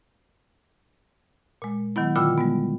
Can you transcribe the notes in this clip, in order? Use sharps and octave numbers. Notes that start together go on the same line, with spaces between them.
A#2 G#3
D#3 F#3 B3 E4
A#2 D3 F4 G5 B5 E6
G3 G#3 B3